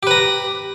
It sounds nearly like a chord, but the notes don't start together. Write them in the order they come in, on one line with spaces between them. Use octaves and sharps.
G4 B4 A#5